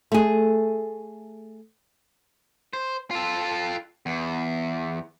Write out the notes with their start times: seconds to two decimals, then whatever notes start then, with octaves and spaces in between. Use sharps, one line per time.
0.12 A3 G#4
2.73 C5
3.11 F4 A4
4.06 E2